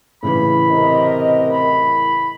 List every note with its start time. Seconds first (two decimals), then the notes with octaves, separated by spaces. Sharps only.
0.23 A2 C#3 E3 B5
0.70 C3 A#4 D#5
1.51 B5